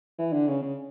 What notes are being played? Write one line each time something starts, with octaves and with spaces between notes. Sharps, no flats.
E3
D3
C#3
C#3